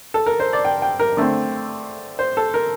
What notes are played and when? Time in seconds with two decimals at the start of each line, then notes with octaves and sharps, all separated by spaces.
0.14 A4
0.26 A#4
0.40 C5
0.53 D5
0.65 G5
0.82 G5
1.00 A#4
1.17 D3 A3 C4
2.19 C5
2.37 A4
2.54 A#4